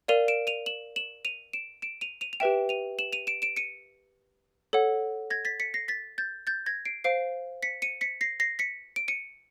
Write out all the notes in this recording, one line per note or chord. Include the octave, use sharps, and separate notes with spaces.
A#4 D5 F5 D#7 F7
D7 E7
D#7 F7
E7 F#7
E7 F#7
D#7 F7
D7 E7
D7 E7
D#7 F7
D#7 F7
F7
G4 B4 E5 G5 D7 E7
D#7 F7
E7 F#7
D#7 F7
D7 E7
D7 E7
C#7 D#7
A4 C#5 F#5
G#6 A#6
A6 B6
B6 C#7
A#6 C7
A6 B6
G6 A6
G6 A6
G#6 A#6
C7 D7
C5 F5 C7 D7
B6 C#7
C#7 D#7
B6 C#7
A#6 C7
A#6 C7
B6 C#7
D7
C#7 D#7